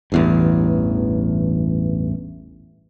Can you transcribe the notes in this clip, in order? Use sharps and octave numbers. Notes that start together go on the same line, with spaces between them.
A1 E2 G2